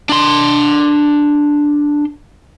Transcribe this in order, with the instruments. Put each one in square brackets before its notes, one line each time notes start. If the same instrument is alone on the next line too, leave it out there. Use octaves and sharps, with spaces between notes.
[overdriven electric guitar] D4 C6